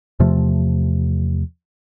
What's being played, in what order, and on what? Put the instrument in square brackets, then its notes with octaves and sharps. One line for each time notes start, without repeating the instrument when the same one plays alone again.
[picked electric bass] E2 C3 F3 A3